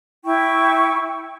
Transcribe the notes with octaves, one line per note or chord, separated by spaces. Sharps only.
E4 G5 C#6